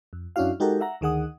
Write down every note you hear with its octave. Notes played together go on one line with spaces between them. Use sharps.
F2
F#2 C#4 D4 E4 F#4 F5
G#3 D#4 F#4 G4 A4 A#4
E5 F#5 A#5
D2 D#3 G#4 F#5 D#6